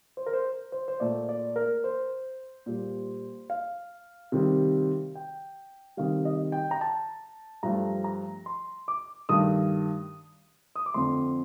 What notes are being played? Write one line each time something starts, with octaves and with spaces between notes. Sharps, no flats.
C5
A#4
C5
C5
C5
A#2 A3 D5
D5
A#4
C5
A#2 G3
F5
C3 D#3 G3
G5
C3 D#3 G3 F5
D#5
G5
A#5
A5
G2 F3 A3 A#5
A#5
C6
D6
G2 D#3 A3 D#6
D#6
D6
F2 D3 F3 A3 C6